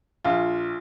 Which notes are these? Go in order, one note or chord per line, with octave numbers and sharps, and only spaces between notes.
A#1 F4